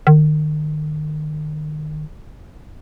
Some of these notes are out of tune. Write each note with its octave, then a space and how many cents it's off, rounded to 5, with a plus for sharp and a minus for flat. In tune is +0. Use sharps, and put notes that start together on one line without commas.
D#3 -35